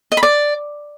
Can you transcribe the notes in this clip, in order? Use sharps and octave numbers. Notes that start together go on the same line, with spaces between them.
D#5
B5
D5